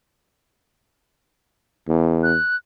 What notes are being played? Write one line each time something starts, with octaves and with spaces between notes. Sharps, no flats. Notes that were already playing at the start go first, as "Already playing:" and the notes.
E2
F#6